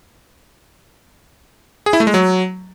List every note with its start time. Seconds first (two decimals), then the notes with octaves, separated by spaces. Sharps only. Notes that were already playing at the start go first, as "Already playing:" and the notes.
1.86 G#4
1.93 E4
2.00 A3
2.07 G#3
2.14 F#3